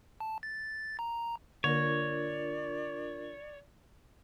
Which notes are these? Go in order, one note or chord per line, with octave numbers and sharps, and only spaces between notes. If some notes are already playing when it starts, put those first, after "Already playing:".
A5
A6
A#5
D3 A#3 D4 F4 A#4 C#5 D5